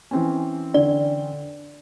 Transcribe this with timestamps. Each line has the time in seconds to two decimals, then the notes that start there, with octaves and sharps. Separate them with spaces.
0.11 E3 C4 C#4
0.74 D3 D5